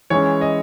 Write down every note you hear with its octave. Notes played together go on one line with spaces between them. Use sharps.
E3 G#3 C#4 C#5
D#5